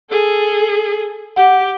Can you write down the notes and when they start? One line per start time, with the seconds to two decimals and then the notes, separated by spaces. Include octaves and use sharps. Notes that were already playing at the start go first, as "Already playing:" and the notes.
0.10 G#4 A4
1.36 G4 F#5